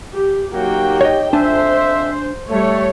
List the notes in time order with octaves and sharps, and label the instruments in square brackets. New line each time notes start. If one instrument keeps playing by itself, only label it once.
[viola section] G4
[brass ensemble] F#3 A#3 F#4 [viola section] D#4 G4 G5
[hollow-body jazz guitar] C#5 D#5
[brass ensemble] F2 E5 [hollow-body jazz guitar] D4 G#5 A5 [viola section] C5
[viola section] G3 C#5 [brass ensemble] A3